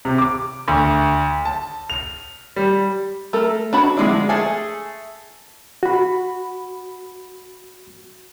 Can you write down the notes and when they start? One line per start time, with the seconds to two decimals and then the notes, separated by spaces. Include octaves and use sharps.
0.05 C3
0.18 D6
0.68 D2
1.45 A5
1.90 F7
2.56 G3
3.33 A3 A4 A#4
3.73 D4 F#4 B5
3.97 D3 F3 F#3 G#3 D4 E4
4.29 A3 G#4 A4 G#5
5.83 F#4 B5